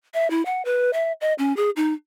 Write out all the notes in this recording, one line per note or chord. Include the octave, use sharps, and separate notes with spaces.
E5
E4
F#5
B4
E5
D#5
C#4
G#4
D#4